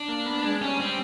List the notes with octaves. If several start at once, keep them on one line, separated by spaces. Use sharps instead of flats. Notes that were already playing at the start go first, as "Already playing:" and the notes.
Already playing: D4
A#3
B3
G#3
G3 C#4
C4